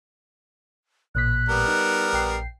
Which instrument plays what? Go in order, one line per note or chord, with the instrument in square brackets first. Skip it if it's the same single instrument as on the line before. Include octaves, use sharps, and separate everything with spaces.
[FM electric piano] A1 A#2 B6 [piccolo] F#6
[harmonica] G3 B3 A#4
[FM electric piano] D#4
A#1 G5 C7